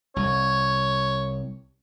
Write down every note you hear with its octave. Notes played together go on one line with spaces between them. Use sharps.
C2 C#5